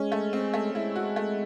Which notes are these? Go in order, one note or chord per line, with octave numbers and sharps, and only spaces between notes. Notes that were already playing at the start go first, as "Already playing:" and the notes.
Already playing: G#3 C#4
A3
C4
A3
G#3 E4
F#4
A3